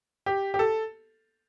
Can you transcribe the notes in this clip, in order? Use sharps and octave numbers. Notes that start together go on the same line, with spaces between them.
G4
G4
A4